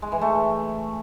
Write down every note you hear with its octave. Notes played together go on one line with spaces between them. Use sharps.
G#3
E3
A3